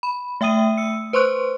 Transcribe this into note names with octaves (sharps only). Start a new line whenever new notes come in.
B5
A3 E5 G5 D#6 D#7
E6 C#7
B4 C5 C6 C#6 F#6